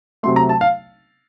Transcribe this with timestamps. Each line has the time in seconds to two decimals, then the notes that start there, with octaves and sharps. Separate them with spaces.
0.23 C3 F#3 A3 C6
0.36 A#5
0.49 A5
0.61 F5